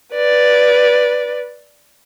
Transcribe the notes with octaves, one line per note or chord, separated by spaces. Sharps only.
B4 D5